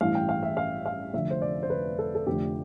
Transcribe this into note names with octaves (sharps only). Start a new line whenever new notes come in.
A1 G2 E3 F5
G5
F5
E5
F5
F5
F1 F2 D3 E5
C5
D5
C5
B4
A4
A4
F1 F2 D3 A3 G4